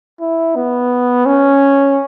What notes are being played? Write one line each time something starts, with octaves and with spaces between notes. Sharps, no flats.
E4
B3
C#4